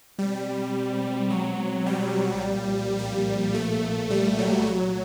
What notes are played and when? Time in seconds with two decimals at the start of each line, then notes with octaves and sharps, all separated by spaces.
0.18 B2 G3 G#3 C4
1.30 F#3
1.86 G3
2.42 C2 A#2 F3 A#3
2.99 G3
3.54 A3
4.10 G3
4.39 F#3
4.67 C2 A#2 F3 F#3 A3